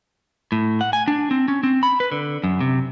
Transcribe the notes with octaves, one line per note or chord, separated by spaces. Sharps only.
A2
F#5
G#5
D4
C4
C#4
C4
B5
B4
D3
F#2
C3